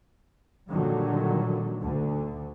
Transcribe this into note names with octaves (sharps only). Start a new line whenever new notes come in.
A#2 D3 D#3 F#3 G3
D2 D3